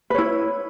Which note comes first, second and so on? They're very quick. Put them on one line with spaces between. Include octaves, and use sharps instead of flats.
B4 C#5 E4